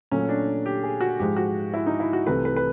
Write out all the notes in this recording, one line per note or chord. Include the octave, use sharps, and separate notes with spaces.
A#2 F#3 A3 C#4
D4
G4
G#4
F#4
G#2 F3 G#3 G4
F#4
E4
D#4
E4
F#4
C2 C3 E3 A3 B4
B4
B4